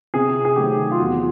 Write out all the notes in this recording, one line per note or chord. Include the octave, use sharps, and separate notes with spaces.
C3 G#4
G#4
D#3 F#3 A3 C4 G4
F4
E2 F#4